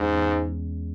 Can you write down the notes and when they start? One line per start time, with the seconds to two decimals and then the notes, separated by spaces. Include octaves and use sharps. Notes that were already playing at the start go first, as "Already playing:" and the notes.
Already playing: E2 G#2 G#3 C#4
0.13 E2